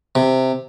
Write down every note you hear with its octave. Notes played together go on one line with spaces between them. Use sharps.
C3